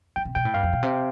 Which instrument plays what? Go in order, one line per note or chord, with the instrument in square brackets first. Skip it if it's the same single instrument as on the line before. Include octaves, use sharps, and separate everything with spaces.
[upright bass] D3 [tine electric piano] G5
[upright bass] C3
[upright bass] B2 [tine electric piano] G5
[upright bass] A2
[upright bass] G2 [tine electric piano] F5
[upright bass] F2
B2
C3